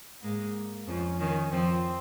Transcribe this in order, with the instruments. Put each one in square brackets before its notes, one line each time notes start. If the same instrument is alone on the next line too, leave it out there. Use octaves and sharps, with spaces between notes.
[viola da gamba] G#2 G#3 [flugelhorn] A#3
[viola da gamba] F2 F3 [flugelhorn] C#4
[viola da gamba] D#3 [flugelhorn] C#4
[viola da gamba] F2 F3 [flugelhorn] C4